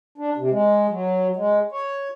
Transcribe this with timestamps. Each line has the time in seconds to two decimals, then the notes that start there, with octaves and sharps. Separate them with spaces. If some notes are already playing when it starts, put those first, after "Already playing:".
0.18 D4
0.37 C3
0.50 G#3
0.90 F#3
1.36 G#3
1.72 C#5